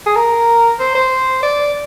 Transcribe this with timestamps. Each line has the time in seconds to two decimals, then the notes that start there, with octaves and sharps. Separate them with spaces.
0.06 G#4
0.16 A#4
0.79 C5
0.95 C5
1.43 D5